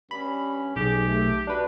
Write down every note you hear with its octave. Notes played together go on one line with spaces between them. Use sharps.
G2 C#4 B5
B1 G4 G#4
A3
D4 F#4 B4